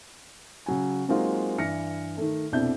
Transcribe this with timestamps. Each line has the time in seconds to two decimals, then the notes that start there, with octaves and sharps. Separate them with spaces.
0.66 C#3 F#3 G#5
1.08 F#3 G#3 A#3 C4 D#4 F4
1.58 G2 E3 F6 A#6 C#7
2.17 D#3 A3
2.52 C2 F2 B2 D4 E4 G6